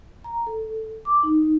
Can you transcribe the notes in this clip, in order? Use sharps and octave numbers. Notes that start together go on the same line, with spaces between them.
A#5
A4
D6
D#4